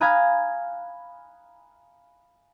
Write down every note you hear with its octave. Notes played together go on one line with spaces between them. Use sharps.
F5 G#5 A#5 B5 D#6 F#6